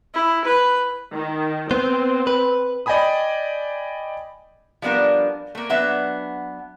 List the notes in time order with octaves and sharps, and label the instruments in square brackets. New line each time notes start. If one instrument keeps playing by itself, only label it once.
[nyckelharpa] E4
B4
[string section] D#3
[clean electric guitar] B3 C5 [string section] C4
[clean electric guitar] B4
[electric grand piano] D5 D#5 G5 G#5 B5 D#6
[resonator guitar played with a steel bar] F3 G3 B3 D4 A#4
A3 A#3
F#3 B3 D4 E5